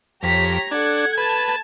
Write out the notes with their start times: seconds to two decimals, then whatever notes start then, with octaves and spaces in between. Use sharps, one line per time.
0.23 F2 G4 C#5 A#5 B6
0.71 D4 A4 F#5 G#6
1.17 B4 A5